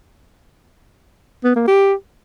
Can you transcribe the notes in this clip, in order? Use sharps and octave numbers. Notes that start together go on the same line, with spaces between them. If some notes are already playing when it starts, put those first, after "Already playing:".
B3
A#3
G4